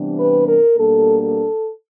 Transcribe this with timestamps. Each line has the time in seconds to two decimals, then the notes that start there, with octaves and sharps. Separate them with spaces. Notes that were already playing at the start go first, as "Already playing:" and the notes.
Already playing: C3 E3 G3 B3 D4
0.19 B4
0.47 A#4
0.77 B2 G3 A#3 D4 A4
1.21 A4